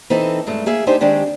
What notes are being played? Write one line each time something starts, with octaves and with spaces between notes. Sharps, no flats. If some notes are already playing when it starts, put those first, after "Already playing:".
E3 C4 D#4 A4
G2 G#3 A3
A#3 G#4 E5
D4 D#4 G4 C5
D#3 G#3 C4 D4 G4